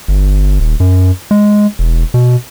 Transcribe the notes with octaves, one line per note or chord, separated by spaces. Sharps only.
G1
D#1
F#2
G#3
E1
B2